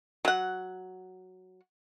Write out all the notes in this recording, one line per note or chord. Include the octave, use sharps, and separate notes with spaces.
F#3 F#5